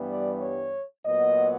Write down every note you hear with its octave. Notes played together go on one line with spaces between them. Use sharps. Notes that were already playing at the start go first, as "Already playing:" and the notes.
Already playing: G2 E3 G3 B3
D5
C#5
A#2 F#3 B3 D#5